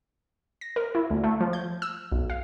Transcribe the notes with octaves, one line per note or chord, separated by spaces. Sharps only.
A#6
A#4
E4
D2
A3
F3
G6
E6
B1
F5